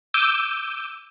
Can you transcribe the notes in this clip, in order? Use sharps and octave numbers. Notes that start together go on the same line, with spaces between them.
D6 E6 G6 D#7